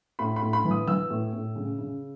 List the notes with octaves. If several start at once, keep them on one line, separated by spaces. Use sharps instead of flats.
A2 B5
B5
A2
B5
E3
D#6
E3 E6
A2
A2
C#3
C#3